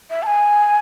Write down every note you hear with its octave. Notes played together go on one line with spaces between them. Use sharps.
E5
A5
G#5